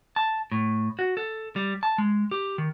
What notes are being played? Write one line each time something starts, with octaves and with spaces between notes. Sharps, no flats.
A5
A2
F#4
A4
G3
A5
G#3
G4
D#3